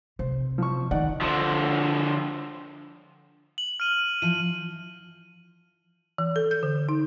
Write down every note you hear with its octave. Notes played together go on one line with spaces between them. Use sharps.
C3 C5
F3 C#6
D#3 D#4 D5 F#5
D3 F3
F#7
F6 D#7
E3 F3 D#7
E3
A4
G6
D3
D#4